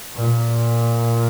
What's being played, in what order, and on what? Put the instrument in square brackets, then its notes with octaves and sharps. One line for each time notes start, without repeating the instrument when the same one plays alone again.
[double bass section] A#2